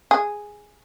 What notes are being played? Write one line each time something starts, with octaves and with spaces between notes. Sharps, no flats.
G#4